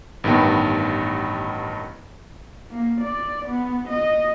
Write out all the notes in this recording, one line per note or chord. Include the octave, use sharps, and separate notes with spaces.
A1 G2 D#3 B3 G5
A#3
D5
B3
D#5